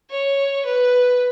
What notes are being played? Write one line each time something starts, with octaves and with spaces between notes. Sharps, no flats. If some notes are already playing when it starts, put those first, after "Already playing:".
C#5
B4